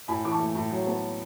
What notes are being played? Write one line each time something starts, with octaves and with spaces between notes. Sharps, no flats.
A2 G#5 B5
E3 D6
A5 C#6
A3
A2
F#3
B3